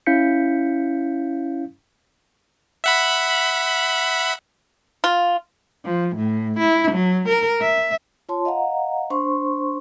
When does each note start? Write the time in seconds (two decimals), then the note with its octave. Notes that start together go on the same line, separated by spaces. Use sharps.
0.06 C#4 E4 F5 G6 B6 C#7
2.84 E5 F#5 B5
5.04 F4
5.85 F3
6.16 A2
6.59 E4
6.91 F#3
7.28 A#4
7.61 E5
8.29 F4 C#5 A5 C6
8.45 D#5 F5 F#5 A#5
9.10 D4 C5 C6 C#6